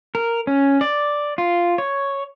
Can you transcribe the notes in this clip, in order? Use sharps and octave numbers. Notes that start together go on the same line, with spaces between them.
A#4
C#4
D5
F4
C#5